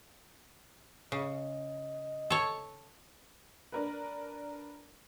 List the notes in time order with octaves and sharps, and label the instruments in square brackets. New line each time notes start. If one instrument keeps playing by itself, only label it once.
[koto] C#3 [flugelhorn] D#5
[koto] A4 C#5
[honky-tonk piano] D4 A#4 B4